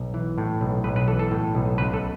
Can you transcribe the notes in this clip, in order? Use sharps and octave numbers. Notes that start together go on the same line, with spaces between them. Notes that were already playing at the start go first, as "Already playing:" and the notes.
Already playing: B1
E3
A2
B1
B1 B4
B4
E3 A4
A4
A2
B1
C#2 B4
A4